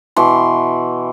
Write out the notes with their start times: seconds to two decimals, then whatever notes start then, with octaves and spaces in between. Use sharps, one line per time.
0.16 B2 E3 C6